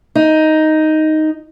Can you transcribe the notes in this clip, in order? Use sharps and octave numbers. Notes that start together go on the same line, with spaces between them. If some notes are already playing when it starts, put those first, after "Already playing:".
D#4